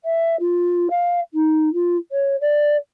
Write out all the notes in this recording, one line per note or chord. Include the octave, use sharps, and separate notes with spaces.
E5
F4
F5
D#4
F4
C#5
D5